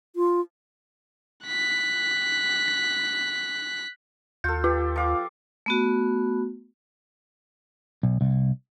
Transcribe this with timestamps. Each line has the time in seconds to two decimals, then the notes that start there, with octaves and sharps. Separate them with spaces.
0.16 F4
1.46 F#6 B6
4.44 D#2 F4 A4 G6
4.64 F4 G4
4.96 F3 F5 D6
5.66 A3 B3 F#4
8.03 B1
8.21 C2